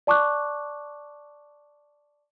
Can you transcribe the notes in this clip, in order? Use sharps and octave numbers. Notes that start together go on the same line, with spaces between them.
D5 A5 C#6 D6 F#6